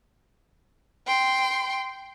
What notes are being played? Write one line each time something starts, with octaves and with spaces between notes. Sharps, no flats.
G5 C6